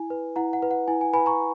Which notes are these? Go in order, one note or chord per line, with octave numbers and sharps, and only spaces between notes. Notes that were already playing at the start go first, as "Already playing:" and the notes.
Already playing: E4 G#5
B4
E4 F#5 A#5
F#5
B4
F#5
E4 G#5
G#5
B4 G#5 B5
A#5 C#6